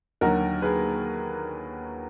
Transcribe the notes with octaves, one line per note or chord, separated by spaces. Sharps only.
D#2 D3 F#3 F#4 A#4
G#4 B4